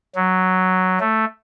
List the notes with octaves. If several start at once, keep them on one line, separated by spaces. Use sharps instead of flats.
F#3
A3